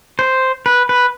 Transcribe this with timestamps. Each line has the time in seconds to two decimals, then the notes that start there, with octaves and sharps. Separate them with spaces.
0.19 C5
0.66 B4
0.89 B4